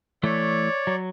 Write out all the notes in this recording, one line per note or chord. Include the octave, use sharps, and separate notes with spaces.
E3 A3 C#5 D5
F#3